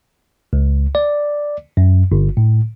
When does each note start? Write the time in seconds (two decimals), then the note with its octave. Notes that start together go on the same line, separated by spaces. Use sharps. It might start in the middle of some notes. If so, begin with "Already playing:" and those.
0.53 C#2
0.95 D5
1.77 F#2
2.12 G1
2.37 A2